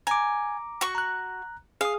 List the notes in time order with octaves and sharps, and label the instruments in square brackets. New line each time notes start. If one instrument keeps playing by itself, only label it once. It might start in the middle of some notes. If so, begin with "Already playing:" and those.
[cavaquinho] G#5 [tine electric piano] A#5 D6
[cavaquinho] F#4 C#6
[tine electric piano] A#5 F#6
[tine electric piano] G#4 D#6 [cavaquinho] F5